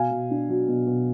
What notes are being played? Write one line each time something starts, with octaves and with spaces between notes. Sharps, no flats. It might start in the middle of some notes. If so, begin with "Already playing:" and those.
Already playing: B2 F5 G#5
B2
D4
F#3
B2
B2